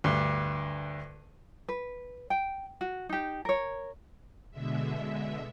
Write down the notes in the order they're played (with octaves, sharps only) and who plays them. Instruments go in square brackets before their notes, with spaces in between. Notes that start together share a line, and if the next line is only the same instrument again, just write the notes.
[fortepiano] D2 G2
[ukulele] B4
G5
F#4
D#4 G4
A#4 C#5
[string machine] B2 D3 G#3 E5